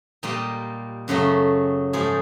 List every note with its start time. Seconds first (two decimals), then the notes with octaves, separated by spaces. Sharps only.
0.23 A#2 G3 A#3 D#4
1.08 F#2 C#3 F#3 A3
1.93 G#2 F3 A3 G#4